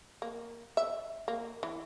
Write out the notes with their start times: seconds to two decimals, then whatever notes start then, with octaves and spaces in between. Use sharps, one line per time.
0.22 A#3
0.77 E5
1.28 A#3
1.63 E3